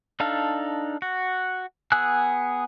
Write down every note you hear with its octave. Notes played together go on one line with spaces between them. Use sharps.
D4 D#4 A4 F5
F#4
B3 G#4 G#5 E6 F#6